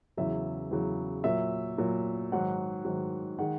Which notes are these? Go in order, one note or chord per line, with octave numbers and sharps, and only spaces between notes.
E2 C#3 F#3 E5
E2 C#3 F#3
A#2 F#3 E5
A#2 F#3
G#2 D#3 F#3 F#5
G#2 D#3 F#3
D#3 G#3 F#5